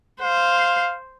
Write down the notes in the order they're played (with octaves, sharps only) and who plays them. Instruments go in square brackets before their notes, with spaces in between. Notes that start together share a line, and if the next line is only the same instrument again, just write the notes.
[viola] C5 [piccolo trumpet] F5